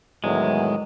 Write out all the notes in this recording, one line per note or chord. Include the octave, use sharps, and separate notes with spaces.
E2 A2 D#3 F#3 G#3